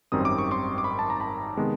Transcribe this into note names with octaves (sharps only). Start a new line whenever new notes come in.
G#1 F#2 D#3 G3 C4 D#6
D6
C#6
C6 D6
D6
B5 C#6
A5
A#5
A5 B5
C3 D#3 G#3 B3